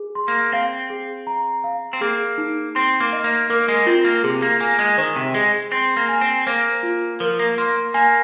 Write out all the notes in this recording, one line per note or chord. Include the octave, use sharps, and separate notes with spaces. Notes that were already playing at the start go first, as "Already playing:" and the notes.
Already playing: G#4
C6
A#3
C4 F5
G#4
A#5
F5
C4
A#3 G#4
D#4
C4 C6
A#3
D#5
A#3
A#3 A#4
G#3
C4 F4
A#3
C3 G#4
A#3
A#3 G#5
G#3
D#3 C5
C3
G#3 G#4
C4 C6
A#3
G#5
C4
A#3 C5
F4
F3 A#4
A#3
A#3 C6
A#3 G#5